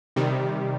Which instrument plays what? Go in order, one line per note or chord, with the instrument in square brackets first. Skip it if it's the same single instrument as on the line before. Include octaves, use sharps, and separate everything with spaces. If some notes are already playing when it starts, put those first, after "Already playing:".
[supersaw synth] C3 D#3 G3